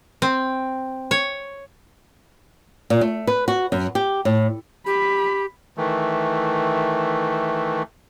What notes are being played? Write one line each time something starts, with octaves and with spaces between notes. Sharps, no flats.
C4
C#5
A#2
A3
B4
F#4
F#2
G4
A2
G4 B5
D#3 E3 A3